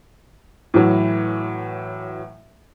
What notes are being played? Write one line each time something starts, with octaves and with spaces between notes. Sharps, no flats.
A2 E3 F#3